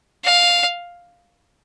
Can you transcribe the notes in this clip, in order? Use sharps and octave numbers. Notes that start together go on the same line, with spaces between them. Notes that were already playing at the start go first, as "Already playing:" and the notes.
F5